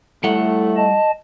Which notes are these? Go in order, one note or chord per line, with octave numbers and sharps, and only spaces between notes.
A2 G3 A3 F#5
D#5 A5